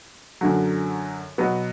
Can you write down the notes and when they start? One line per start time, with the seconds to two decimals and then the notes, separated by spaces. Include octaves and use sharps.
0.41 F#2 D3 F#3
1.38 B2 F#3 B3